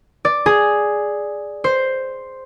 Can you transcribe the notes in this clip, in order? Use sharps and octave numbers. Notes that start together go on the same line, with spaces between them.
D5
G#4
C5